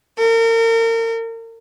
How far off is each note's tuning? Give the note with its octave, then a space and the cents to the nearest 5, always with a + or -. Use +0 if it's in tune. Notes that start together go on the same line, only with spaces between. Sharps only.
A#4 -35